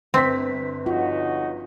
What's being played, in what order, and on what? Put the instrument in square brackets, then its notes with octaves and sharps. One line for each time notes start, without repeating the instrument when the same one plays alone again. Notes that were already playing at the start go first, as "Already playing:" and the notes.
[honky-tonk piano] G1 B6 [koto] C4
[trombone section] C#2 D#4 F#4 [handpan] F4